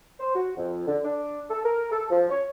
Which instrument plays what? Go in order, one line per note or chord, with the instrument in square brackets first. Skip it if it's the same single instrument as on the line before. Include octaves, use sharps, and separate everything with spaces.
[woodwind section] C5
F#4
F2
D3
D4
A4
A#4
A4
F3
C#5